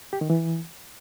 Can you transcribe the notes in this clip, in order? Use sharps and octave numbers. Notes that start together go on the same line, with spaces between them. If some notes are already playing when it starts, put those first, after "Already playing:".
G4
D#3
E3